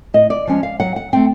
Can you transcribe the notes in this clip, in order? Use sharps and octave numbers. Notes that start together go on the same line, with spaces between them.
A2 D#5
D5
F3 G#3 C#4
F5
F#3 F#5
F#5
A3 C4 G5